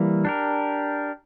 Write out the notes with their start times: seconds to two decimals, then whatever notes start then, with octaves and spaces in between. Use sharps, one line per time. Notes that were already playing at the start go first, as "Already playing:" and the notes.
Already playing: E3 G3 A#3
0.25 D4 G4 A#4